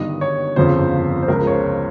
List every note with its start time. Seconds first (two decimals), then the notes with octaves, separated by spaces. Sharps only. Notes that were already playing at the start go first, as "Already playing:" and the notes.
Already playing: G1 G2 D#3 D#5
0.21 C#5
0.56 G1 F2 C#3 F3 C5
1.23 C5
1.28 C#2 C#3 F3 A#4
1.47 C#5
1.51 C5